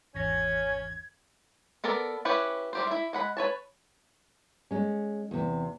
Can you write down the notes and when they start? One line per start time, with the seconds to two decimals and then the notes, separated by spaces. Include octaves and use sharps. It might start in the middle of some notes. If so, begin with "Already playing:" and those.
0.15 G#1 E2 C#4 G#6 A#6
1.84 B3 A4 A#4 D5
2.25 C#4 E4 G4 B4 C#5
2.73 G3 G4 C5
2.87 E4 E5
3.13 G#3 F#5 B5
3.37 B4 C#5 A5
4.71 G#3 C#4
5.31 E2 C3